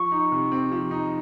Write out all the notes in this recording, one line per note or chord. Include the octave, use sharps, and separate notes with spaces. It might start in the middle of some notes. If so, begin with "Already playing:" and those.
Already playing: F3 C#6
D#4
C3
C4
F3
D#4